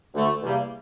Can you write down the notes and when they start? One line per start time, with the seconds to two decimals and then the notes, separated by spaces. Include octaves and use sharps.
0.14 D2 D3 A3
0.42 E2 C3 G3 A#3